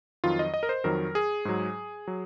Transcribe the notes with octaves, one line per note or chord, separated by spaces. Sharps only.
F2 D#3 F#3 F4
D#5
D#5
A#4
C5
F2 D#3 F#3 A#4
G#4
G#2 F#3
F#3